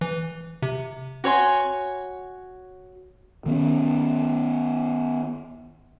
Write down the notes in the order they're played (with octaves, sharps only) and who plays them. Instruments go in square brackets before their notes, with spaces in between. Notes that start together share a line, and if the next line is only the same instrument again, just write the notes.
[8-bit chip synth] E3
C3
[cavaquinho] F#4 C#5 G#5 C6
[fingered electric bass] D#3 B3 C#4